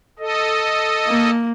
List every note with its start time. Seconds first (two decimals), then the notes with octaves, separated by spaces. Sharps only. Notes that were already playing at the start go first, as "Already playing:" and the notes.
0.19 A4 D#5
1.07 A#3